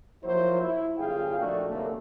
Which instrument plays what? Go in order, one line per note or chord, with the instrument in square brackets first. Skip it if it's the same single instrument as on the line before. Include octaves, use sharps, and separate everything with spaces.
[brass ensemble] F3 F#3 A#3 E4 F4 C5
E4
G1 F#2 F4 G#4 F5 G5
A#1 A3 D#4 F#4 D5
C2 F#2 D3 A3 A#3